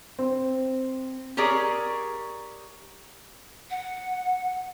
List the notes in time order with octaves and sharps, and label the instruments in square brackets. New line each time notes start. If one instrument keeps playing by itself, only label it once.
[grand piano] C4
[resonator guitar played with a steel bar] G4 G#4 A#4 C#5 D5
[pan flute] F#5